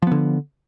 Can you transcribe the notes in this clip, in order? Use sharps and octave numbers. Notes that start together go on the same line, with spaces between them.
D3 F3 B3